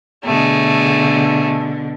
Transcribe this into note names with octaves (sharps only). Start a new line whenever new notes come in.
B2 D3 A3 G#4